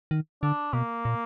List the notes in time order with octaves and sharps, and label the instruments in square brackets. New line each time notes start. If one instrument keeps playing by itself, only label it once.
[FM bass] D#3
[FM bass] D3 [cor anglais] D4
[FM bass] B2 [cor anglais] A#3
[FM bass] A#2